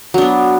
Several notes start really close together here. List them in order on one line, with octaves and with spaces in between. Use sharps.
F#3 D4 B3